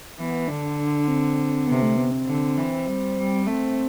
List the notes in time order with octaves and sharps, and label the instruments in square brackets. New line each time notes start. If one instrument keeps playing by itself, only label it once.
[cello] E3 [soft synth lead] B3
[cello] D3 [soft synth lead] D4
[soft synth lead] C4
[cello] C3 [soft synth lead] B3
[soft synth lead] A3
B3
C4
[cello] D3
E3
G3
G3
[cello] A3 [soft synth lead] C4